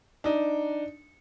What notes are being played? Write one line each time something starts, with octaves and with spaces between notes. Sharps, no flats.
D4 D#4